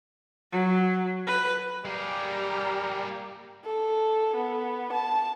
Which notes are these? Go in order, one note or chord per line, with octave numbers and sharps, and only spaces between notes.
F#3
B4
G3 A#3 G4 G#4 A#5
A4
B3
A5